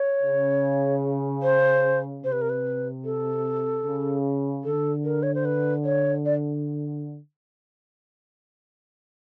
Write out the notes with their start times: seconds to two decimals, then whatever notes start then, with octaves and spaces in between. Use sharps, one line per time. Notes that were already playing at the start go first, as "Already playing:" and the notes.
Already playing: C#5
0.23 C#3
1.43 C5
2.23 C3 C5
2.32 B4
2.42 A#4
2.49 B4
3.05 A4
3.85 C#3
4.64 D3 A4
5.04 A#4
5.23 C#5
5.35 C5
5.45 B4
5.85 C#5
6.26 D5